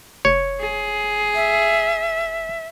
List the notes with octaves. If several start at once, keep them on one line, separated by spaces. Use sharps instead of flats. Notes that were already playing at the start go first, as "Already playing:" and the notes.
F1 C#5
G#4
E5